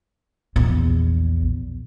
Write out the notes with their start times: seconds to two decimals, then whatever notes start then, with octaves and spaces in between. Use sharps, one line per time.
0.56 A#1 E2